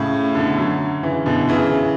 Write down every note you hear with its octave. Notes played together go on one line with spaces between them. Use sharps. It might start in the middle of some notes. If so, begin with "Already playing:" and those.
Already playing: A2 C#3
B2 D3
D3 F#3
C#3 E3
B2 D3
C#3 E3